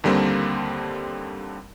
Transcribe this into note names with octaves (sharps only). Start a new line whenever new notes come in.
D#2 D3 G3 A#3 C4